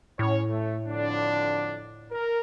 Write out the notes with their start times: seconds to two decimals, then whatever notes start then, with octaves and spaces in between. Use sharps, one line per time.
0.19 A2 C#4 C#5
0.50 A3
0.87 F2 D3 D4
2.11 A#4